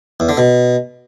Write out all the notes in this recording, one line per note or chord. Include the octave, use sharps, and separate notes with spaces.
E2
D3
B2